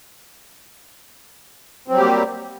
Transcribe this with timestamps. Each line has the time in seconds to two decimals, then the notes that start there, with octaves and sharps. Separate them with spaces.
1.88 C4
1.91 F#3
1.94 G3
1.97 G4
2.00 A#3